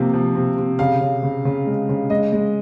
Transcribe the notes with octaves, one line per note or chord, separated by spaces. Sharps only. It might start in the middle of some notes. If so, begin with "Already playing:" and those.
Already playing: C3 F3 A#3
F3
C3
C3
C#3 F5
C#3
C#3
C#3
G#3
C#3
G#3 D#5
G#3